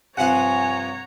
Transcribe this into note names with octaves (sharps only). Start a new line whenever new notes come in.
G2 C3 F3 C#5 F#5 G#5 A#5